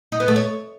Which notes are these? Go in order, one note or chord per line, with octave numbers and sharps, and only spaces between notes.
D#4
B3
A3
C#5